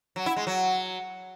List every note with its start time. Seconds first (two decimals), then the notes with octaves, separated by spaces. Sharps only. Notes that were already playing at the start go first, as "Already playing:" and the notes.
0.16 F#3
0.26 E4
0.36 G#3
0.47 F#3